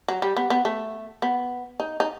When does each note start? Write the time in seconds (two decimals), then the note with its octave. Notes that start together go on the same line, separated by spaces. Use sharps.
0.08 F#3
0.22 G3
0.37 B3
0.50 B3
0.65 A3
1.22 B3
1.80 D#4
2.00 D#4